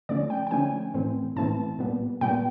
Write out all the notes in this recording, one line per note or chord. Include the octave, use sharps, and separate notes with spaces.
D3 F3 A3 C#4 D5
G5
G5
D3 F3 A3 C#4 G#5
A2 E3 A3 C4
A2 E3 A3 C4 A5
A#2 G3 B3
A#2 G3 B3 G5